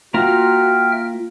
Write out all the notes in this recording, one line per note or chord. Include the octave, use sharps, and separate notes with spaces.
A#3 F4 F#4 E5 G5 A#5 F6